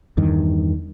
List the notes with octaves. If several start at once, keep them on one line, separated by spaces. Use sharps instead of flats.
E2 G2 D#3